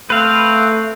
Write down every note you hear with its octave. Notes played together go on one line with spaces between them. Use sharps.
A3 C4 B4 F5